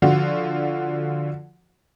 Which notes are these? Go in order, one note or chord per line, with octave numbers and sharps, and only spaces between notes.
D3 F3 F4 F#4